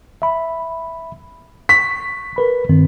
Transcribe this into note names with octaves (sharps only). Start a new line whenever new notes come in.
E5 B5
C#6 B6
A#4 B4 B5
G2 D#3 C4